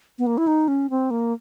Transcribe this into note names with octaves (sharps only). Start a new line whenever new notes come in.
B3
A#3
E4
D#4
C#4
C4
A#3